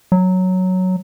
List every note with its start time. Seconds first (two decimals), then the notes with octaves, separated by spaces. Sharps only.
0.12 F#3